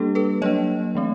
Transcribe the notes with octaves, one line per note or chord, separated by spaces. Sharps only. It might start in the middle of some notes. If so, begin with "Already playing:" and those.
Already playing: G3 A#3 D4 G4 A4
A4 B4
F#3 A#3 D4 C#5 D#5
E3 A3 C4